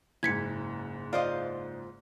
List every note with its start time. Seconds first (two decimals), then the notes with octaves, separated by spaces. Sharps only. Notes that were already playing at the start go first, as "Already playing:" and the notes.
0.23 F#1 G#2 G#6 B6 C#7
1.13 F4 C5 D5 D#5 F5